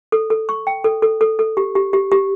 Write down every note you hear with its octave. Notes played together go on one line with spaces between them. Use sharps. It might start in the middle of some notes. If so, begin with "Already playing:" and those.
A4
A4
C#6
G5
A4
A4
A4
A4
G4
G4
G4
G4